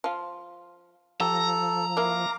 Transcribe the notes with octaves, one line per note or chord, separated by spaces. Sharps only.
F3 F4
F3 G4 A4 A#5
A#3 E4 F5 D6